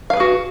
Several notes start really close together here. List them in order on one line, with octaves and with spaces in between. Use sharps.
F5 B4 G#4 F#4